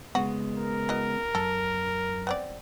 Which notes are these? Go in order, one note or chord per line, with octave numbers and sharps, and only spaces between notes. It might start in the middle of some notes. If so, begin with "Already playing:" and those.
C#3 G#3 B3 F#4
A#4
E3 F#4 D#5
F#2 A4
B3 C4 D5